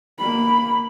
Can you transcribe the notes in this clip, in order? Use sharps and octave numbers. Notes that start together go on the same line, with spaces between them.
A#3 B5